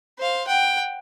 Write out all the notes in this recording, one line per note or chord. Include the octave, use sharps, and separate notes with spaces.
C5 F5
F#5 G5